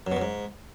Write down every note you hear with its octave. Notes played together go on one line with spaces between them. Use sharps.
F#2
B2
F#2
G#2